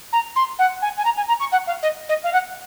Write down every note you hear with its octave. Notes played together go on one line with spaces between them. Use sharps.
A#5
C6
F#5
G#5
G#5
A#5
G#5
A#5
C#6
F#5
F5
D#5
D#5
F5
F#5